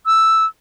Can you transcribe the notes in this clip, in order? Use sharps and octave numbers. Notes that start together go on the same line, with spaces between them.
E6